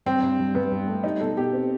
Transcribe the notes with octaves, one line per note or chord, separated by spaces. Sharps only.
G2 C4
G2
G2
G2 B3
G2
A3
G3 D#4
B2 A4
B2 G4
C4